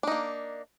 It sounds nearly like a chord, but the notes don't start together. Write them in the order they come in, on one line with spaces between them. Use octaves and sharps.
D4 D#4 A#3